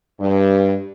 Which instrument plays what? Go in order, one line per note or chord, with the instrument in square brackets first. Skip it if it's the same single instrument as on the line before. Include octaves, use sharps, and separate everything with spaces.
[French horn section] G2